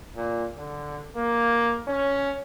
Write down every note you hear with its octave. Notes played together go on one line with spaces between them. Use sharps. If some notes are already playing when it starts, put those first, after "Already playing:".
A#2
D3
A#3
C#4